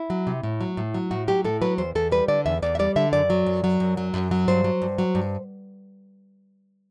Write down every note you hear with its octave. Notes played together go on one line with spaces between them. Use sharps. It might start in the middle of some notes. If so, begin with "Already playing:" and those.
Already playing: E4
F#3
C3
A2
F#3
A2
F#3
A2 F#4
F#3 G4
A2 A4
F#3 B4
E2 C5
E2 A4
G3 B4
D3 D5
E2 E5
E2 D5
E5
G3 D5
D3 E5
F#2 D5
F#3
F#2
F#3
F#2
F#3
F#2
F#3
G2 C5
F#3
G2
F#3
G2